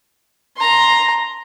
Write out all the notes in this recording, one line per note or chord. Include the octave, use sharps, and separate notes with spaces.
A#5 C6